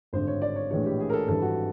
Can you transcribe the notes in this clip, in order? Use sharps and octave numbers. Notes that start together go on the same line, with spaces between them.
G#1 G2 D3 C5
C#5
D5
C#5
A#1 A2 E3 G#3 C#5
G4
G#4
A#4
A4
G#1 G2 E3 G3 A4
F#4